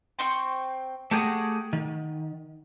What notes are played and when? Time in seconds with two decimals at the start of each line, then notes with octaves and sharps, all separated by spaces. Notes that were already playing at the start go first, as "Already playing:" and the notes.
0.19 C4 G5 C#6
1.11 A3 G4 G#4 F#5 A#5
1.73 D#3